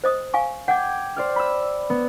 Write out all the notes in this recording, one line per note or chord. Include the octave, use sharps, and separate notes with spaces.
C5 D#5 D#6
F5 G#5 C#6
F#5 G5 D6 G#6
C5 D5 F6
B5 E6
B3